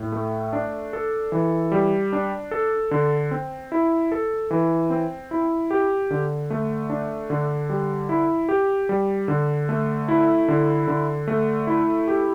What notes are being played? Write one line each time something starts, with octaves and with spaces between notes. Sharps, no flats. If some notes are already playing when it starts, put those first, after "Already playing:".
Already playing: A2
A3
D4
A4
E3
G3
D4
A4
D3
C4
E4
A4
E3
C4
E4
G4
D3
A3
D4
D3
G3
E4
G4
G3
D3
A3
E4
D3
D3
A3
E4
G4